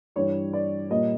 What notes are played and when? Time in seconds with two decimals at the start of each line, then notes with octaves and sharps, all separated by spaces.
0.16 G2 E3 G3 C#5
0.53 D5
0.90 A#2 G3 A#3 D#5